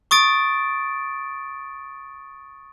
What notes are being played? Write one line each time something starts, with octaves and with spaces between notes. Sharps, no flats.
C#6 D#6 A6 D7